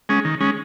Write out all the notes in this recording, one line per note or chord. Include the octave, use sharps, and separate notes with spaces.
G#3 C#4
D#3
G#3 C#4